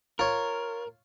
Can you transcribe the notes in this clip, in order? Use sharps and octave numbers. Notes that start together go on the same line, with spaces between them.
F4 A#4 C#5